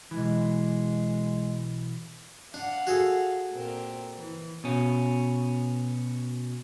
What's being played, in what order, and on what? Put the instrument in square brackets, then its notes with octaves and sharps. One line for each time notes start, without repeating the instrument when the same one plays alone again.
[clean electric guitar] B1 E3 [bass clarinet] G#3
[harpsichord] D4 [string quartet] F5 F#5
[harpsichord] F#4 G#4 A4
[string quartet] A#2 C4 A#4
E3
[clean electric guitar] B2 C#4